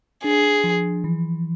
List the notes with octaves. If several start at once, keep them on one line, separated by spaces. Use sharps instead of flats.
D4 G#4
F3
E3